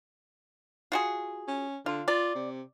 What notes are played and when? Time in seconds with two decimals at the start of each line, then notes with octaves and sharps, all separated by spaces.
0.92 F4 F#4 G#4
1.48 C#4
1.86 D3 F4
2.08 F4 D5
2.35 C3